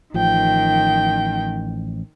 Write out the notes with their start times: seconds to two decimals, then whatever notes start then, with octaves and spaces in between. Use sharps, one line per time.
0.14 A1 D#3 F3 G5